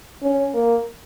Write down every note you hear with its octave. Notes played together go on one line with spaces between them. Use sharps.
C#4
A#3